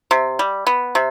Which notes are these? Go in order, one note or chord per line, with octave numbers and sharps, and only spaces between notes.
C3
G3
B3
C3